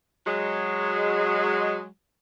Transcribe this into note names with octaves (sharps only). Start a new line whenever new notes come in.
F#3 G#3